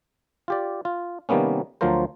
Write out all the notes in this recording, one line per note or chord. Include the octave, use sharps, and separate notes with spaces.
F4 G4 D5
F4
C3 D#3 G3 A#3 B3 C#4
D2 F3 F#3 F4 A#4 C5